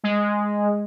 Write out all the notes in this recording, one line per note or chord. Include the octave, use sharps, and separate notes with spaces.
G#3